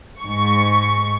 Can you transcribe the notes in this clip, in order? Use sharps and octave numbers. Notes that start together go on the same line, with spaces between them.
G#2 C#6